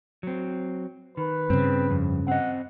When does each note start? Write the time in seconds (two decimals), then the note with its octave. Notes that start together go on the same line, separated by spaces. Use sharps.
0.23 F#3 C4
1.17 D#3 B4
1.50 G2 C#3 C4
1.90 F2
2.28 C4 D#5 F#5